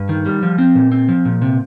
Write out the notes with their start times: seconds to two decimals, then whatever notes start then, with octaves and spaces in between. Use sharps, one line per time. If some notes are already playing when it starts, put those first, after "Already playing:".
Already playing: G2
0.09 D#3
0.26 G3
0.43 F3
0.58 C4
0.75 A#2
0.92 C4
1.09 F3
1.25 A#2
1.42 C3